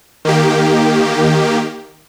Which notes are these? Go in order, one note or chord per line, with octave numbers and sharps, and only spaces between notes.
D#3 A#3 G4